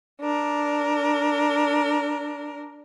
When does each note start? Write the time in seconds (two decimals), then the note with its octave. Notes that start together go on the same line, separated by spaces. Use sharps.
0.21 D4 A#4